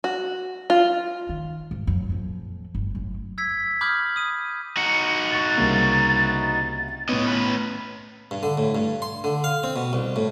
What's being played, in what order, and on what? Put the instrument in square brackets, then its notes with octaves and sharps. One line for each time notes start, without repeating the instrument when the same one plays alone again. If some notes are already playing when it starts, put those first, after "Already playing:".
[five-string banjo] F#4
F4
[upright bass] D#3
G#2
F#2
F2 A#2
G1
F#2 A2
[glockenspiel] E6 G#6 B6 C#7
B5 D6 D#6 F6 G6 G#6
D#6 D#7
[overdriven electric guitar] D#4 F#4 [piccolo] C#7
[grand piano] C#6 F#6 [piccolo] A6
[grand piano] C2 C#3 A#3
[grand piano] A2 B3 [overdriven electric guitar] C#5 D#5
[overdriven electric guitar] C#4 B4
[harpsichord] G2
D3
A2
G2
C6
D3
F5
C4
B2
C2
A2